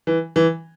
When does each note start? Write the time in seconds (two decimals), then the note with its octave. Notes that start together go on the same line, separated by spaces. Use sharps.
0.07 E3
0.36 E3